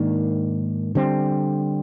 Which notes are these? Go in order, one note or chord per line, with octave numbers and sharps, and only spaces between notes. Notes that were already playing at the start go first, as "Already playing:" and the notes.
Already playing: G#2 D#3 A#3 D4
D3 G3 C4